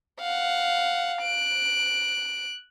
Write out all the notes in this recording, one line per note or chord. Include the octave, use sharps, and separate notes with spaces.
F5 F#5
F#6 D7